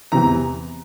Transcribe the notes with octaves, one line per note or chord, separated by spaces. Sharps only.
E2 C3 E3 A#5